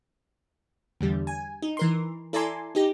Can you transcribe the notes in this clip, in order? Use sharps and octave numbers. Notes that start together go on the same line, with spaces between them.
E2 D3 G3
G#5
D#4
E3 A#4 C6
E4 A4 D5 G#5 A#5 C6
D#4 G4 A#6